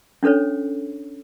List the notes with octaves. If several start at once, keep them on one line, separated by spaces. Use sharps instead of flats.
C#4 D4 A4 C5 C#5